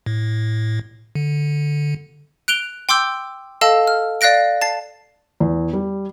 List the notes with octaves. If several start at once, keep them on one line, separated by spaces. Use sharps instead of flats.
A2
D3
F#6 D7 F7 G7
G5 C6 D6 E6 G6
A4 D#5 F5 A5 E6
F6
D5 F5 F#6 A#6 D7
A5 A6 C7
E2
G3